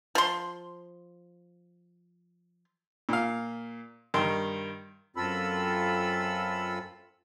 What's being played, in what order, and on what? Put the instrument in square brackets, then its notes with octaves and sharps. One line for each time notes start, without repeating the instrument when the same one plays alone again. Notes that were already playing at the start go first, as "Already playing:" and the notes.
[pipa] F3 C6
[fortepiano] A#2 F5
G2 D#3 C6
[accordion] F#2 C4 F4 A4 B5 E6